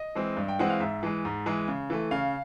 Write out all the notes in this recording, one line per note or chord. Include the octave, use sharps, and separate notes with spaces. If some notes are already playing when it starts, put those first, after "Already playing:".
Already playing: D#5
E3 G#3 C4
G2
G5
E3 G#3 C4 F#5
F5
G#2 E5
E3 G#3
G#2
E3 G#3
C#3
E3 A3
C#3 F5